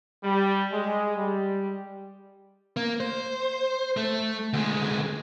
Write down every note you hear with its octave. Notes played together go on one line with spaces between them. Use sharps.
G3
G#3
G3
A#3
C5
A3
D2 G#3